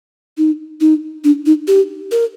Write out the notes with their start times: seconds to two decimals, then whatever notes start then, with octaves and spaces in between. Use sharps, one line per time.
0.38 D#4
0.81 D#4
1.24 D4
1.46 D#4
1.67 G4
2.11 A#4